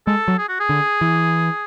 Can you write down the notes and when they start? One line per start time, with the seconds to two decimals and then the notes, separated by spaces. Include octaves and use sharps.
0.07 G#3 A4
0.28 F#3
0.38 G#4
0.49 F#4
0.60 G#4
0.69 D3
1.01 E3